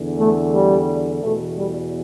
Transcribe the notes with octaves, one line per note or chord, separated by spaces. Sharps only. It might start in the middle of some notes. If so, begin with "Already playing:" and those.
Already playing: E2 D3
A3
G3
E2 B2 A3
G3